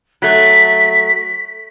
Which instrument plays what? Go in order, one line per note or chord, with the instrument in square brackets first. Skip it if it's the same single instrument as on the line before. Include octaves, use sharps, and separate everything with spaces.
[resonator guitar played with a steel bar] F#3 A3 [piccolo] B6